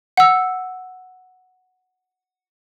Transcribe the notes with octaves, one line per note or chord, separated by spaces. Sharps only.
F#5 E6